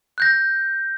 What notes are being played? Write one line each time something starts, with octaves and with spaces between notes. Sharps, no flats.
F#6 G6 A#6